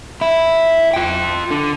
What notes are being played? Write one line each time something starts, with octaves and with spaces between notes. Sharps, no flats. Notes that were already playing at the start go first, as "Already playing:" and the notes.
E4
F4 G5
D3